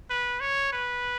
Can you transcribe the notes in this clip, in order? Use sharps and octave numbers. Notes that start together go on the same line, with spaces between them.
B4
C#5
B4